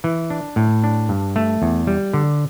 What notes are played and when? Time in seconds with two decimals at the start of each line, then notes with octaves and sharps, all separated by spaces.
0.04 E3
0.30 D4
0.56 A2
0.84 D4
1.09 G2
1.36 A3
1.62 E2
1.87 G3
2.13 D3